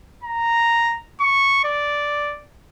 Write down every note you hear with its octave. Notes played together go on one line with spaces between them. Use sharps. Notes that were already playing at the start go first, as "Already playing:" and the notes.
A#5
C#6
D5